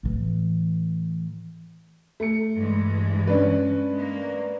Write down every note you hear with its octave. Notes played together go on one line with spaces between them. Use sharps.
A2 E3
A3 C#7
G2 E3 G#3
C#4 D4 B4
G#3 A#3